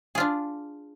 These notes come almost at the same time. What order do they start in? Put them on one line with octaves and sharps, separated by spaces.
G#4 F4 D4